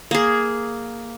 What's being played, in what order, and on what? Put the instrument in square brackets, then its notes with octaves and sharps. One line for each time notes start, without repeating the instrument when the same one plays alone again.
[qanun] A#3 G#4